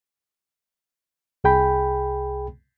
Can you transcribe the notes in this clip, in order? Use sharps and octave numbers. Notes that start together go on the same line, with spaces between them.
C2 G#4 G5 B5